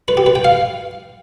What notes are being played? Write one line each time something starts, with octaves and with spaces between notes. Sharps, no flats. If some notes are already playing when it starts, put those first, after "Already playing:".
B4
G4
B4
G5
F5